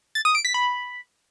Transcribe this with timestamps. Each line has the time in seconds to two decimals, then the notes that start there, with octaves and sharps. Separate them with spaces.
0.15 A6
0.25 D#6
0.35 D7
0.45 B6
0.54 B5